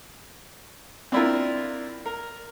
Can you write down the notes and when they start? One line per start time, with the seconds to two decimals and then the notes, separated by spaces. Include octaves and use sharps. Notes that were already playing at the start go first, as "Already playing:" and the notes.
1.12 C4 D4 E4 F4 A#4
2.06 A#4